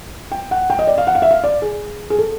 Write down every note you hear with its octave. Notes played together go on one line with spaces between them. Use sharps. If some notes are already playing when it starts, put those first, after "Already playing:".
G5
F#5
G5
D#5
D5
F5
F#5
F5
E5
F5
D5
G#4
G#4
A4